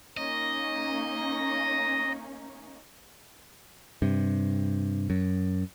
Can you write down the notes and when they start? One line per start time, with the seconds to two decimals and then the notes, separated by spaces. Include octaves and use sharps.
0.17 A#3 C#4 D#4 D#5
4.02 G2 C3
5.10 F#2